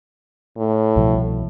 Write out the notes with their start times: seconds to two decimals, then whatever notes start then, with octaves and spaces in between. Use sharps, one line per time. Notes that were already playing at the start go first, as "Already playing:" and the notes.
0.58 A2
0.96 C2 B2 F3